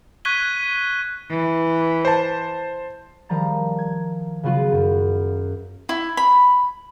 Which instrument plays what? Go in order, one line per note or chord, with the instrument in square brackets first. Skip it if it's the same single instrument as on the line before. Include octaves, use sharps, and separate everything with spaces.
[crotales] C#6 F#6 G#6 B6 D#7 G7
[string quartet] E3
[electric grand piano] C5 A5
[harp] D#3 F3 G3 A#5 A6
G#6
C#3 F#3 B3 F4 F#4
F#2
[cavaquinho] E4
B5